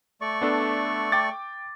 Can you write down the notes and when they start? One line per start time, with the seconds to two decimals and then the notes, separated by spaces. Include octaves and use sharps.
0.21 A3 D5 C#6
0.41 B3 D4 A4
1.12 G5 D6 A6